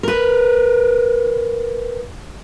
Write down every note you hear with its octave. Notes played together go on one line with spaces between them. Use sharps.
A#4 B4